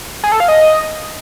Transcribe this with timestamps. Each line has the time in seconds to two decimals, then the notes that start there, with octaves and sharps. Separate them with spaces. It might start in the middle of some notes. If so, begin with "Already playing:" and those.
0.24 G#4
0.32 A4
0.40 F5
0.48 D#5